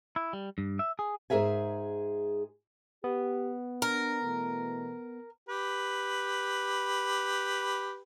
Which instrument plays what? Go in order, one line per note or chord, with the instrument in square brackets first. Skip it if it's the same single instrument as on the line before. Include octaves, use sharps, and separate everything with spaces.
[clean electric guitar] E4
G3
G2
E5
G#4
[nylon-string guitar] G#2 G#4 A#4 E5 G#5
[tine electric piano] B3 [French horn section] G4
[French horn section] D4 [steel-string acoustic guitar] A#4
[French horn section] B2 E3 A3
[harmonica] G4 B4